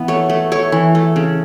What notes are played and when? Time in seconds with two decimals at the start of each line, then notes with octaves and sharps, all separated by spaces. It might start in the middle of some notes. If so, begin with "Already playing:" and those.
Already playing: E3 B3 B4
0.08 A3 C#5
0.30 A3
0.52 A3 C#5
0.72 E3
0.95 A3
1.16 C#3